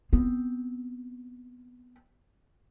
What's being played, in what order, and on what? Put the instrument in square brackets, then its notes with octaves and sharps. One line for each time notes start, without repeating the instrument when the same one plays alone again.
[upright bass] B3 C4